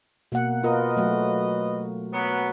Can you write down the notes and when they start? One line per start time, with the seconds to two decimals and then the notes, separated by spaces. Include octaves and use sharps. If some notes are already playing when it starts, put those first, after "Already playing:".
0.32 B2 A#3 F#5
0.63 F4 A#4 B4 D#5
0.97 F#3 A3 F#4
2.12 F#3 B3